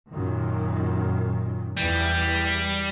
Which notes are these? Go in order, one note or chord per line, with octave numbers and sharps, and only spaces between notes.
F#2 A#2 D#3
E2 E3 G3